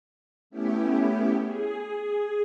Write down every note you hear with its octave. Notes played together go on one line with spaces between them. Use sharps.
A3 B3 C#4 E4 G4
G#4